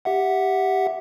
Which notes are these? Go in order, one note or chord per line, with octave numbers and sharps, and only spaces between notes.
G4 E5 F#5